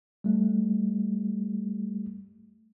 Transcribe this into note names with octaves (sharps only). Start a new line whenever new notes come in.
G3 A3